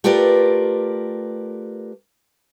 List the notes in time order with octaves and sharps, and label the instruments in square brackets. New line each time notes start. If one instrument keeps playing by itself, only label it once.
[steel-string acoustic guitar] A3 F4 G4 A#4 B4 D5